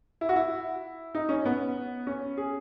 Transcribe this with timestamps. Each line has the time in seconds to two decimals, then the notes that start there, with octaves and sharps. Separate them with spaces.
0.21 E4
0.29 F#4
0.36 E4
1.15 D#4
1.29 C#4
1.46 B3
2.07 C#4
2.37 G#4